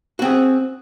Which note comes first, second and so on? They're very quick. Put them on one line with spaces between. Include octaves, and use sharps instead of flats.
F#4 C4 G#4